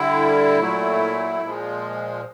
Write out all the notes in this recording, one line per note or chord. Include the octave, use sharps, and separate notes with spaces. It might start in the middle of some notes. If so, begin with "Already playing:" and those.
Already playing: D3 G3 E4
A#2 F#3 A3
A#2 F3 G#3